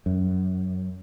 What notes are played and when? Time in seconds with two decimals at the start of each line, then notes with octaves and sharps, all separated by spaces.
0.06 F#2